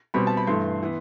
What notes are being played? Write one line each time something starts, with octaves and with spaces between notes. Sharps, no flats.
B2 G3 C4 B5
A5
B5
G2 E3 A3 C6
E3 B3